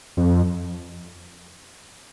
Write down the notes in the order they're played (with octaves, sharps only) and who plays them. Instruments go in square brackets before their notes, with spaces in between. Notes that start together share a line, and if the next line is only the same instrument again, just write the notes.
[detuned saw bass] F2